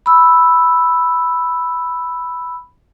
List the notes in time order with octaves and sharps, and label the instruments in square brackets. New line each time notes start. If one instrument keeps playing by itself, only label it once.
[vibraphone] B5 E6